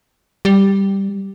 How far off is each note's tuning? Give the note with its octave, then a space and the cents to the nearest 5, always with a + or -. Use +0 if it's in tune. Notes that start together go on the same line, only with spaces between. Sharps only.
G3 +0